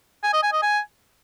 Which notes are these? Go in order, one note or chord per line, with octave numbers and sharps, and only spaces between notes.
G#5
D#5
G#5
D#5
G#5